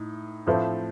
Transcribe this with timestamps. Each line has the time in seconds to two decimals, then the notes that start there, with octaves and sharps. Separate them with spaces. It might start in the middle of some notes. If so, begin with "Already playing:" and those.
Already playing: A2 D#4
0.47 A2 F3 A3 C4